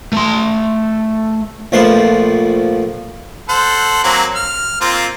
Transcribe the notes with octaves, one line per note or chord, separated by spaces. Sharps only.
A3 C6
A#1 F3 A3 B4 C6
A4 C5 F#5
F#3 A#3 C4
F6
A#3 C4 F4